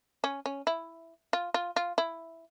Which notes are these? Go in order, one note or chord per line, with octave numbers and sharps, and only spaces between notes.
C#4
C#4
E4
F4
F4
F4
E4